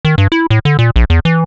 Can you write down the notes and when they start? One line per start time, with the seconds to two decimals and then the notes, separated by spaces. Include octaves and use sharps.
0.05 D#3
0.18 G2
0.32 E4
0.50 A2
0.65 D3
0.79 A#2
0.96 A#1
1.10 E2
1.25 E3